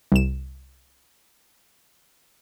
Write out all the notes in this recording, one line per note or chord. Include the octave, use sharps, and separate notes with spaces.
C2 E7